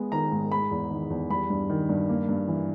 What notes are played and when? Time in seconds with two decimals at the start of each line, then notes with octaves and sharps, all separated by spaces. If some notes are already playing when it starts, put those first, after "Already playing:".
Already playing: G#3 B3
0.12 D#3 A#5
0.32 G#2
0.52 G#3 B5
0.71 E2
0.91 D#3
1.10 E2
1.30 G3 B5
1.50 G2
1.70 D#3
1.89 G2
2.09 A#3
2.29 G2
2.48 E3